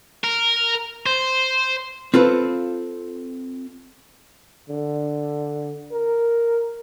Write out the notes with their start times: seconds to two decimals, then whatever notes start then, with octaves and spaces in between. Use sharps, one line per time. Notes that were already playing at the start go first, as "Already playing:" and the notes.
0.24 A#4
1.06 C5
2.14 C4 F4 A4 B4
4.70 D3
5.92 A#4